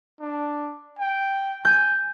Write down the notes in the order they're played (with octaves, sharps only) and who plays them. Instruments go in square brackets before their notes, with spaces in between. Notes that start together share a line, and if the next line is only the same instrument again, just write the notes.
[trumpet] D4
G5
[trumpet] G#5 [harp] G6